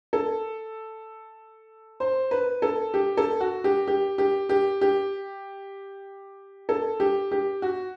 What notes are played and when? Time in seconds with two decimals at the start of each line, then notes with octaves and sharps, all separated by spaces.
0.13 A4
2.00 C5
2.31 B4
2.62 A4
2.94 G4
3.17 A4
3.40 F#4
3.64 G4
3.87 G4
4.18 G4
4.49 G4
4.81 G4
6.69 A4
7.00 G4
7.31 G4
7.62 F#4